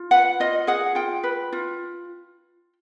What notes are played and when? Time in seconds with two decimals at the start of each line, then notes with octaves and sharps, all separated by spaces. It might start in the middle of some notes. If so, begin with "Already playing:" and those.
Already playing: F4
0.11 B4 F#5
0.40 F4 D#5
0.67 G#4 F#5
0.95 F4 G5
1.24 B4
1.53 F4